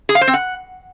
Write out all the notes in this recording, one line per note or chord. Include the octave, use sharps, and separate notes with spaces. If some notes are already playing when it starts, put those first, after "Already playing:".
G#4
F5
C5
C4
F#5